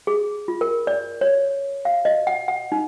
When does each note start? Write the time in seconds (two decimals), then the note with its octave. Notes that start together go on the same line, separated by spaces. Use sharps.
0.07 G#4
0.48 F4
0.61 A#4
0.87 D5
1.21 C#5
1.85 F5
2.05 D#5
2.27 F#5
2.48 F#5
2.72 D#4